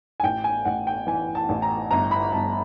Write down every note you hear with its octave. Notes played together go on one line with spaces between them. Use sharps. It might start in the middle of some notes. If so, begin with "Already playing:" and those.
G#5
A1 G5
G#5
A1 F#5
G5
E3 G#5
A5
A1
A#5
G1 A#5
B5
G1 A5